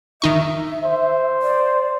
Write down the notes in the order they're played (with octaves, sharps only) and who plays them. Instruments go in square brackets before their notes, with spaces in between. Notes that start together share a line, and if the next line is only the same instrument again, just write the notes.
[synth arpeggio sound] D#3 D#4 C#6 [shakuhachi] E5
[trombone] C5
[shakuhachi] D5